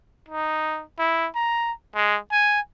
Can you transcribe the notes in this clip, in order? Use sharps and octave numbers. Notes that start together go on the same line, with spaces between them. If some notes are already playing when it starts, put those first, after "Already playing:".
D#4
E4
A#5
G#3
G#5